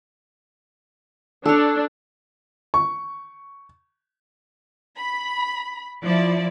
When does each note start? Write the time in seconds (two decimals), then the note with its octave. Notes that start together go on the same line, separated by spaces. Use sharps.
1.46 D4 A4 C#5
2.74 C#6
4.97 B5
6.04 F3 E4 D5